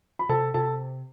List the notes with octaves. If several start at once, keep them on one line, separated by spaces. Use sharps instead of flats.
B5
C3 A4 A5
C3 A4 A5